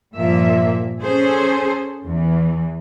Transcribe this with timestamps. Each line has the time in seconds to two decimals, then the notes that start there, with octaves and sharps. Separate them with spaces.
0.15 G2 A#2 F3 A#3 E5
1.01 C#4 G#4 A4 C5
2.06 E2 E3